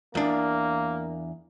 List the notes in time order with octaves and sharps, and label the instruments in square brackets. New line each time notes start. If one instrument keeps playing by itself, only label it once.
[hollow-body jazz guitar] E2 D4 [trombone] A#3